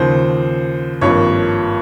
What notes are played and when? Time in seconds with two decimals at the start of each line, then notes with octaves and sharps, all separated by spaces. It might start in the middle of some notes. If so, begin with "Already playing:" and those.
Already playing: D#2 C#3 F3 C5
1.01 G#1 G2 F3 A#3 C#5